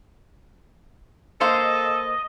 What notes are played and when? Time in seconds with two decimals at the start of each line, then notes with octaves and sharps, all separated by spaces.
1.41 A#3 A4 C5 D#5 F5